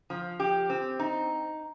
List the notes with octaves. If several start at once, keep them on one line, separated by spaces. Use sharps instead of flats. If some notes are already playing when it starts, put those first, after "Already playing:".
F3
G4
C4
D#4